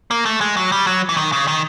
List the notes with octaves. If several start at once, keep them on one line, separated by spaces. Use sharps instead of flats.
A#3
A3
G#3
F#3
G3
F#3
E3
D#3
C#3
D#3